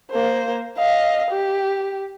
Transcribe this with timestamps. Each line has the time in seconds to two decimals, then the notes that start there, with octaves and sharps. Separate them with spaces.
0.11 A#3 C5
0.77 D#5 F5
1.30 G4